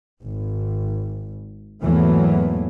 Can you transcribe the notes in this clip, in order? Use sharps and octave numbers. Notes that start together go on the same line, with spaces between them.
G#1
E2 G#2 E3 F#3 A3 A#3